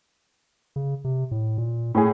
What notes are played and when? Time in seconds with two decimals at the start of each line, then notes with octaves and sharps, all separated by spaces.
0.76 C#3
1.04 C3
1.31 A2
1.58 A#2
1.95 A2 G#4